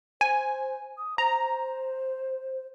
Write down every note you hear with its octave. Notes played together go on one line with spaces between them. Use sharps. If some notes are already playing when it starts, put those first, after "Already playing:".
C5 G#5
D#6
C5 A#5